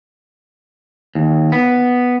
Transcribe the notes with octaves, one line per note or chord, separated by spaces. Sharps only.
D#2
B3